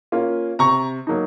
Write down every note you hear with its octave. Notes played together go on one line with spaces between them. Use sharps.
A#3 C#4 F4
C3 A#5 C#6
F#3 A#3 D#4